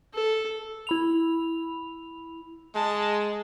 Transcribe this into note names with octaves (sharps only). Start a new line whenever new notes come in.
A4
E4 B5 F7
G#3 A5